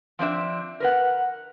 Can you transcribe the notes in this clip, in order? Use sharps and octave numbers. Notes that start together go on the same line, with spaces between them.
F3 C4 D4 E5
A#4 B4 F#5